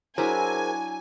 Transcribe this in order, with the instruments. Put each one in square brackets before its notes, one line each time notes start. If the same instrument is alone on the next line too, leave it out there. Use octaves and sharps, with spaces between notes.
[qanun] F#3 D4 E4 [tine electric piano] G#4 A#4 C5 [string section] G#5